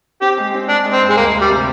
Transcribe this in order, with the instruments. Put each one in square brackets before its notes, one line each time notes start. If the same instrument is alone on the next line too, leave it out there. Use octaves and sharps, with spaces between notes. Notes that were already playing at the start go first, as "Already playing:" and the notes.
[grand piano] C4 [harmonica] G4
[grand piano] G#3
C4
[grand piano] G#3 [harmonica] D4
[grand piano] G#3
[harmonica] C4
[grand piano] G2
[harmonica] G#3
[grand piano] D2 [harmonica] A#3
[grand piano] D2
[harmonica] G3
[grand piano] C3